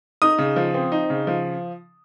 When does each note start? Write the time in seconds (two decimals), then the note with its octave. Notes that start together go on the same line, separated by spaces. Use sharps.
0.22 D#4 D#6
0.38 C#3
0.56 F3
0.74 C4
0.92 D#4
1.10 C#3
1.27 F3